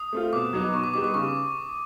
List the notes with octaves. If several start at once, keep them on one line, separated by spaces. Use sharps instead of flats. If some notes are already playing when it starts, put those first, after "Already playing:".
Already playing: D#6
A3 C4 F4
B2 D6
F#3 B3 D#4
B2 C#6
D6
G3 B3 D#4 G4 D6
D6
C#3 C#6